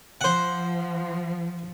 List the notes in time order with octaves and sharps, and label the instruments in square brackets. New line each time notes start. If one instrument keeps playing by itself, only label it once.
[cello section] F3 [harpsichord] C5 F#5